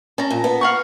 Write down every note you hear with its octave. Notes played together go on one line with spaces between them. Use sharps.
C#4 A5 A#5
A#2
B3
F5 F#5 C#6